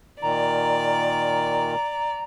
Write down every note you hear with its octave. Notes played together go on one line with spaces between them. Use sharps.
A#2 D#3 D5 A#5